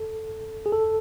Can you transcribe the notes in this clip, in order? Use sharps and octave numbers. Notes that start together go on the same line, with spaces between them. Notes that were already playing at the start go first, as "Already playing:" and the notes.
Already playing: A4
G#4
A4